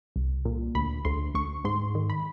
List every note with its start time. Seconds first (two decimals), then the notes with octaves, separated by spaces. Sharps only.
0.16 C2
0.45 A#2
0.75 D2 B5
1.05 D2 C6
1.35 D2 C#6
1.64 G#2 C6
1.95 D#3
2.10 B5